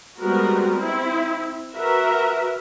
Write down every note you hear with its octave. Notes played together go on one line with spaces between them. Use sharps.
G3 G#3 B3 C4 F#4 A#4
C4 E4
F#4 A#4 B4 E5